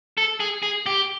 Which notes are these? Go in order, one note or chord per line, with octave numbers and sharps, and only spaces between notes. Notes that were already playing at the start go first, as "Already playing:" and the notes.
A4
G#4
G#4
G4